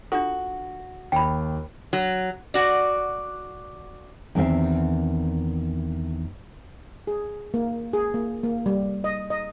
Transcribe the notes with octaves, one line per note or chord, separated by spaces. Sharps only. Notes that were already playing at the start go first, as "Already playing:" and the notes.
D4 F4 F#4 A4
D#2 G5 B5
F#3
F#4 D5
E2 D#3 C4 E5 F5
G#4
A#3
G#4
A#3
A#3
G3
D#5
D#5